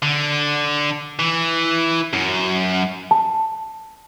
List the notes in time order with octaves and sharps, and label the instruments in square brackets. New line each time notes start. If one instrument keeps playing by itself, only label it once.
[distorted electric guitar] D3
E3
F#2
[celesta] A5